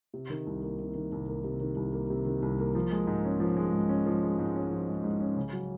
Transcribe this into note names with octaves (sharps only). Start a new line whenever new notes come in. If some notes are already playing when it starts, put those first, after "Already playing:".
C3
D#3
C2
A#3
C3
D#3
C2
A#3
C3
D#3
C2
A#3
C3
D#3
C2
A#3
F3
G#3
G#2
C#4
F3
G#3
G#2
C#4
F3
G#3
G#2
C#4
F3
G#3
G#2
C#4
C#3
F#3